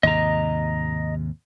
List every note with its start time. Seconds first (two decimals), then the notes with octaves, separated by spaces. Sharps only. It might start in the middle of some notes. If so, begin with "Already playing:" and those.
0.03 D#2 G#2 C3 D#5 A#5